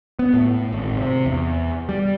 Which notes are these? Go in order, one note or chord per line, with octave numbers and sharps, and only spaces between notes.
B3
A2
G#1
C3
E2
G3